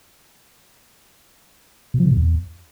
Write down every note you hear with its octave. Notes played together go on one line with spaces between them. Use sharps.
B2
F3
C#3
A#2
E2